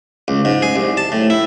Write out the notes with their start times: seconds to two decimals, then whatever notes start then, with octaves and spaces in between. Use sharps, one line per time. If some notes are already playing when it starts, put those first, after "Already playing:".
0.28 C#2
0.45 G#2
0.62 G#4
0.76 C2
0.97 A5
1.12 A2
1.30 E4